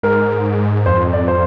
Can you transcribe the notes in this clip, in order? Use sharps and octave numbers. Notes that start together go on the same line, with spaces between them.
G#2 A#4
F2 C5
D5
C5